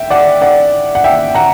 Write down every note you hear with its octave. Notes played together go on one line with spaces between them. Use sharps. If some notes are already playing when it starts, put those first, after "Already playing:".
Already playing: E5 G5
D5 F#5
D5 F#5
F#5
E5 G5
F#5 A#5